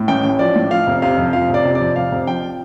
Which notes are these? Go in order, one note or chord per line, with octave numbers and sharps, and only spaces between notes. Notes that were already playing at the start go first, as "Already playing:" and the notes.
Already playing: A2
A1 G5
A1
F3 D5
A2
F3 F5
F1
C3 F5
F2
F3 F5
F1
D5
C3
D5
F2
F1 F5
F1
F3 G5